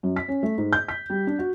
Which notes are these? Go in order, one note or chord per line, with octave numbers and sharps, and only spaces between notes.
F#2
B6
C#4
A3
G#2
G6
B6
G3
D4
F#4